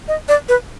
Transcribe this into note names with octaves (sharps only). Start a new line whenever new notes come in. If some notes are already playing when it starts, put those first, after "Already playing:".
D#5
D5
B4